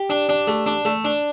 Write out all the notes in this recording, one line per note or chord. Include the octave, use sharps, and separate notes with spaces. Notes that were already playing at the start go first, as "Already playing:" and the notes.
Already playing: G4
D4
D4
A3
D4
A3
D4